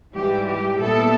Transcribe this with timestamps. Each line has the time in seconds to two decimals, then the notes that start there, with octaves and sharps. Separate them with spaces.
0.15 G#2 E3 G3 G4
0.46 G4
0.79 A#2 G3 B3 E4 A4